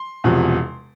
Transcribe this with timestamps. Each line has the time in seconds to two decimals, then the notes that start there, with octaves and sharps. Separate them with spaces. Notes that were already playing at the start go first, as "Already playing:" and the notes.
Already playing: C6
0.24 E1 E2 C3 F3